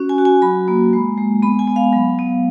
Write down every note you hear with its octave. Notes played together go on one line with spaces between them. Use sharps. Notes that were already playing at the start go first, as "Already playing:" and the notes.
Already playing: C#4 F#4
G#5
F#4
G#5
F#3 B5
A#3
G#3
G#3
B3 B5
G#5
B3
F5
F#3
B3